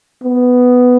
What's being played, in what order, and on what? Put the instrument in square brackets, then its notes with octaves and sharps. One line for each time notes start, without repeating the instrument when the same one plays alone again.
[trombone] B3